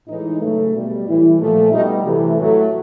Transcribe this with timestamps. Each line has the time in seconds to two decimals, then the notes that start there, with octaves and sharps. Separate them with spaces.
0.09 A2 E3 G#3 D#4
0.41 C#3 F#3 A3
0.74 B2 G3
1.07 A2 E3 G3 E4
1.39 A#2 F3 A3
1.72 B2 G3 D#4
2.05 C3 E3 A3 G4
2.37 A2 F#3 A3